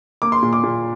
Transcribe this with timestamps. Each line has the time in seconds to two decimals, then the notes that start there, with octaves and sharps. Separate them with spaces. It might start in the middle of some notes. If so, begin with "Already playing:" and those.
0.22 A#3 D6
0.32 C6
0.42 A#2
0.53 D6
0.63 A#2